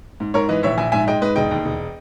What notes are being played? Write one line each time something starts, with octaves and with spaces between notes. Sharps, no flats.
G#2
G#2 A#4 C#5
E3 B4 D#5
A#1 C#5 E5
A#1 E5 G#5
G#2 E5 G#5
G#3 D#5 G5
G#2 B4 D#5
E1 D#5 G5
D#2
E1